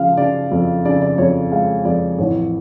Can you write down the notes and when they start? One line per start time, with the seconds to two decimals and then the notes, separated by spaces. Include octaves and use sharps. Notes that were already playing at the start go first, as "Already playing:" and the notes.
Already playing: C#3 F3 F5
0.17 C#3 D5
0.52 F2
0.85 C#3 D5
1.01 D5
1.18 F2 C#5
1.51 G#3 F5
1.85 F2 D5
2.18 A1 C#5